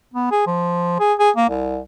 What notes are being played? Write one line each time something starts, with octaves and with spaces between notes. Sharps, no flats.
B3
G#4
F3
G#4
G#4
A#3
C2